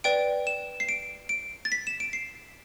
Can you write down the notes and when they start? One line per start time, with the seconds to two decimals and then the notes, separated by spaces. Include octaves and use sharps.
0.04 B4 D5 G5 D7
0.47 E7
0.80 C7
0.89 D7
1.29 D7
1.65 A6
1.72 B6
1.87 E7
2.00 D7
2.13 C7